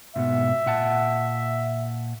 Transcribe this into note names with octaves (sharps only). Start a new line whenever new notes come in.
G#2 B2 B3 E5
A#2 F#5 A5